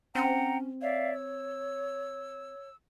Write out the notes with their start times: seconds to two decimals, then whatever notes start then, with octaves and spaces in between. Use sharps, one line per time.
0.15 C4 C#4 F#5 G5 A#5
0.81 C#5 D5 E5 F5
1.13 E6